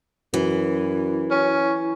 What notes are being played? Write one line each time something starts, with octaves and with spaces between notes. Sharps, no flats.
F#2 E3
C#4